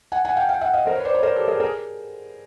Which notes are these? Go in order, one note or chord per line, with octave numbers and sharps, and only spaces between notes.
F#5 G#5
F#5 G#5
F5 G5
F5 G5
E5 F#5
D#5 F5
A#4 C5
B4 C#5
C5 D5
B4 C#5
A#4 C5
G4 A4
G#4 A#4
G#4 A#4